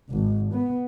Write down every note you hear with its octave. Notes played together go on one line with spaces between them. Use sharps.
G#1
B3